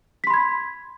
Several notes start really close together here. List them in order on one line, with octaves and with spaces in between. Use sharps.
B6 C6 B5 G#6